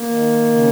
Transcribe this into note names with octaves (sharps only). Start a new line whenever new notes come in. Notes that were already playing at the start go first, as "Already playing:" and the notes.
Already playing: A#3
D#3
C#3